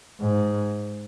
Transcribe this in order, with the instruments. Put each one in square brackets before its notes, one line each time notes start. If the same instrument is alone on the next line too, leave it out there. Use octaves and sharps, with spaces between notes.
[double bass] G#2